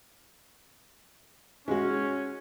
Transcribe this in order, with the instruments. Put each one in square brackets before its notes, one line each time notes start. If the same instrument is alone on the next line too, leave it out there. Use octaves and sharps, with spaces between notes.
[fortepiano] G#3 F#4 [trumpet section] C#4